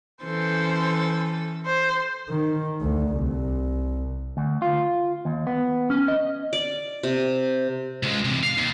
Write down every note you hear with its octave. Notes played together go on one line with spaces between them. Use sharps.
E3 C#4 A4 C5
C5
D#3
D2
C2
D2
F4
D#2
B3
C#4
D#5
D5
C3
C#2 G#3
C3 E3
F5
D#2